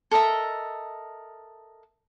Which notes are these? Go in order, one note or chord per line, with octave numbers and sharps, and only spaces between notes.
A4 A#4 D#5 E5